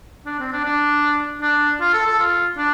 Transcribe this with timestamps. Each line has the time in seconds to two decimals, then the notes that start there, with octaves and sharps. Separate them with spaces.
0.26 D4
0.39 C4
0.52 D4
0.65 D4
1.42 D4
1.81 F4
1.93 A4
2.06 A4
2.19 F4
2.57 D4